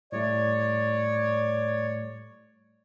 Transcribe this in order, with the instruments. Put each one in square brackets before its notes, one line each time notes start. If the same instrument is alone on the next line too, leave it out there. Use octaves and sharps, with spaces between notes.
[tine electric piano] A2 G3 A3 [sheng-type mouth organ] C#5 [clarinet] D5